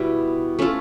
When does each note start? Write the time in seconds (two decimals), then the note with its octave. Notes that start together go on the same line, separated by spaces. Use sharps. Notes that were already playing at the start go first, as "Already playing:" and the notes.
Already playing: B2 G3 B3 E4
0.59 A3 C#4 F4 A4